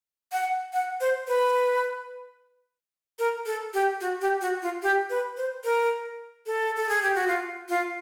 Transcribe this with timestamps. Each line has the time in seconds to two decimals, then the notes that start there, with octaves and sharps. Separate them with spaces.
0.32 F#5
0.73 F#5
1.01 C5
1.28 B4
3.19 A#4
3.46 A4
3.74 G4
4.01 F#4
4.21 G4
4.41 F#4
4.62 F4
4.82 G4
5.10 B4
5.37 C5
5.64 A#4
6.46 A4
6.76 A4
6.89 G#4
7.02 G4
7.15 F#4
7.28 F4
7.69 F4